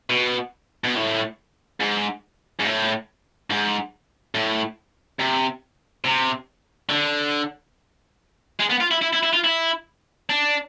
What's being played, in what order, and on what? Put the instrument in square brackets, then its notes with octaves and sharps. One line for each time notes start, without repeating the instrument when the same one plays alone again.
[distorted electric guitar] B2
B2
A2
G#2
G#2
A2
G#2
A2
C3
C3
D3
G#3
B3
F4
E4
E4
E4
E4
F4
E4
D4